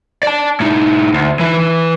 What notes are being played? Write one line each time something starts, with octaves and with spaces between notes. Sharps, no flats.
D5 A5
A2 D#4
D2
E3 B4